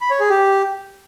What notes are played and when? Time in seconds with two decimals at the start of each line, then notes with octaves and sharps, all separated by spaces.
0.01 B5
0.10 C#5
0.20 G#4
0.30 G4